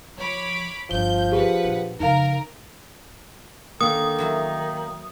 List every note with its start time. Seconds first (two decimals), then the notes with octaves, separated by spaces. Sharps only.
0.17 F3 C#5 B5 D6
0.91 G1 F3 D4 G6 G7
1.32 G4 G#4 B4 F#5
1.65 A#2 D4
2.00 F2 C#3 D#4 A#4 F5
3.81 D3 D#3 A#3 C#4 D#6
4.18 F#3 E4 F#4